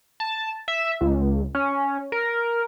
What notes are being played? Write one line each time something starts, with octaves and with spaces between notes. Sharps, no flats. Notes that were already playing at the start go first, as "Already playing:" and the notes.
A5
E5
C#2
C#4
A#4